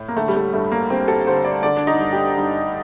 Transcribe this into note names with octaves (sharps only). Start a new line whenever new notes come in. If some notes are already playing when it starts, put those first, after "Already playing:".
Already playing: A2
A#3
D3 A3
G3
A3
G2 A3
A#3
G2 C4
A4
D3 C5
D5
D3 D5
D4
D#4
G2
G4
G2